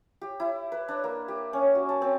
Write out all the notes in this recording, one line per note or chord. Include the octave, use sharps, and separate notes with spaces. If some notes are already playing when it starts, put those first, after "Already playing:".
G4
E4
B4
D4
A#3
G4
C#4
F#4
A5
C4